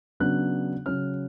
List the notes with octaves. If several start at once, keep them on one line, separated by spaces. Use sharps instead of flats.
C#3 F#3 B3 D4 F#6
C#3 F#3 C#4 F6